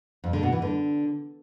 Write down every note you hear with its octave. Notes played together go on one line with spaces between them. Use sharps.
F2
D3
B2
E3
D3